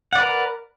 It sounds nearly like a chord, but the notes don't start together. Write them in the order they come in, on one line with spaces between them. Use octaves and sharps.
F#5 D5 B4 A#4